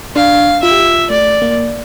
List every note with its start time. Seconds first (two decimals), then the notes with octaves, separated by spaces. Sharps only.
0.16 D4 F5
0.63 F4 E5
0.71 G4
0.80 F4
1.10 A3 D5
1.42 A#3